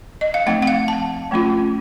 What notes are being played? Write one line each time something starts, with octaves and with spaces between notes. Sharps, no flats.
D#5
F5
F3 A3 C4 D#4 F#5
F#5
F5
A5
F3 A3 C#4 F4